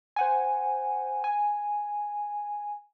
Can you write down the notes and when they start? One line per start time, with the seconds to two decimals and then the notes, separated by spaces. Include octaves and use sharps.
0.16 C5 F#5 G#5
1.24 G#5